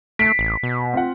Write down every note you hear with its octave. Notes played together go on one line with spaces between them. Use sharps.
A3 B6 C7 D7
A1
B2
C4 F4 F#5